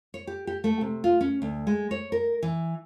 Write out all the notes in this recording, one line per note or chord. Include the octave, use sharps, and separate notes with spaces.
C#5
G4
G4
A3
C3
F4
C#4
D2
G#3
C#5
A#4
E3